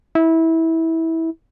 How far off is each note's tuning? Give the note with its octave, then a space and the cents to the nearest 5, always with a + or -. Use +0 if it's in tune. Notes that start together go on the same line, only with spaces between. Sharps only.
E4 -20